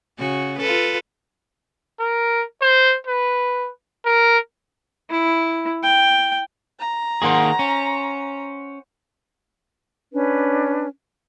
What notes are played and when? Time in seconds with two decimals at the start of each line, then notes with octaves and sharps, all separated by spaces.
0.18 C#3 F#4
0.59 F4 A4 B4
2.00 A#4
2.62 C5
3.07 B4
4.06 A#4
5.11 E4
5.84 G5
6.80 A#5
7.22 D#3 A#3 G#4 C5 F#5 C#6
7.59 C#4
10.12 C#4 D4 B4